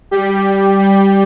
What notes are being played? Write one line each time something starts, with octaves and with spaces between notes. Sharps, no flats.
G3 G4
G3 G4